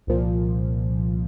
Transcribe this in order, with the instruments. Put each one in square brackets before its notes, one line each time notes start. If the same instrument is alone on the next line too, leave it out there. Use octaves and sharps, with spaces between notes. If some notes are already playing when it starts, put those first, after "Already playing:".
[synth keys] C2 A#2 F3